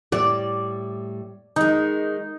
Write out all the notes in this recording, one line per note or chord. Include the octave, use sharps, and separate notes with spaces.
A2 G3 D5
D#3 G#3 D#4